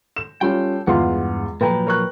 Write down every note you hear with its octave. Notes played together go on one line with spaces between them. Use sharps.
E7
G3 C#4 F4 A4 G5
E2 G2 G#3 F4 F#5 C6
A#2 F3 F#3 B4 G5 A#5
A#4 C#6 F#6